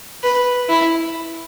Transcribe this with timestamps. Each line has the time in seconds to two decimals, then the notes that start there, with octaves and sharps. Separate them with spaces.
0.23 B4
0.69 E4